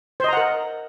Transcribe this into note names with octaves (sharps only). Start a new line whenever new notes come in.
A#4 C5 D#5 F#5 A#5